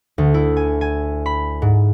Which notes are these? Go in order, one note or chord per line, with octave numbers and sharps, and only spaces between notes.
D2
E4
G#5
G#5
B5
G#2